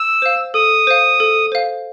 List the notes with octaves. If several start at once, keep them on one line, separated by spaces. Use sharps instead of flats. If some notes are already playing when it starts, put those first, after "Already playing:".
Already playing: E6
C5 F5
A4 D#6
C5 F5
A4
C5 F5